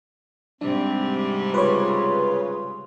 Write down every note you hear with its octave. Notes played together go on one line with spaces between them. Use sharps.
G#2 C3 G3 C4 D4
C#3 F4 B4 C#5